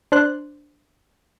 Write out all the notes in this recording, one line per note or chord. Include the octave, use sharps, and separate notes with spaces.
D4 C5 F#6